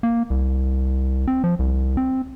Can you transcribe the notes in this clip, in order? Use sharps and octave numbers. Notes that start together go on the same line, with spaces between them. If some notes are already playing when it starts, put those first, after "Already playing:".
A#3
C2
C4
F3
C2
C4